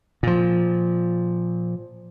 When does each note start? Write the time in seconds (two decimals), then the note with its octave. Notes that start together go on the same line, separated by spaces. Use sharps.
0.23 A#2 F3